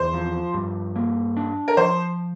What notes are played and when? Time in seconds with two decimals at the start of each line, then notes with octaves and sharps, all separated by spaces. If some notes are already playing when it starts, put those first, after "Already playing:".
Already playing: E2 C5
0.13 F3
0.54 G2
0.96 A#3
1.37 D4
1.68 A#4
1.77 F3 C5